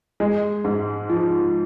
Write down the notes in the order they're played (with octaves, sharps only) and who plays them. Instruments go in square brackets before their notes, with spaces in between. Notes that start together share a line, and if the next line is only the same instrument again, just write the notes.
[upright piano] G#3
G#2
F3